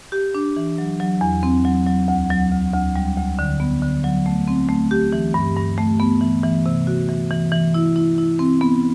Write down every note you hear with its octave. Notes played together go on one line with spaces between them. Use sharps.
G4
D4
E3
F#3
F#3
E2
C4
F#3
F#3
D2
F#3
D2
D2
G3
D2
D3
B3
D3
F#3
A3
C4
A3
G4
E3
G2
G2
A3
B3
E3
E3
C3
F#4
E3
E3
E3
E4
E4
E4
C4
B3